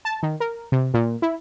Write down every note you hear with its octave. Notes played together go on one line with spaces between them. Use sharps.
A5
D#3
A#4
C3
A#2
E4